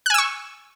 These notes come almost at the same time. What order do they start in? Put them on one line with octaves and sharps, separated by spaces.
F#6 G#5 E6 C#6